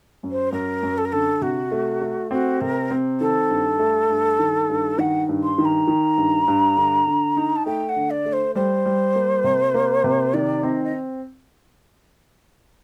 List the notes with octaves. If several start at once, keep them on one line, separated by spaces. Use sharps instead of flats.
F#2
C5
F#2 A#4
F#2
A4
A#4
D3 A4
C3 F#4
A3
A3
C4 F#4
C3 A#4
C4
D#3 A4
G2
A3
G2
D#3
G2
D#3 F#5
G2
C6
D#3
A#5
D#3
G2
G2
D3
D3
D#4
A5
A3 G5
F#5
D3
D5
A3
C5
G3 C5
G3
A#3
C3
A#3
C3
D#3 D5
C4 D#5
D#5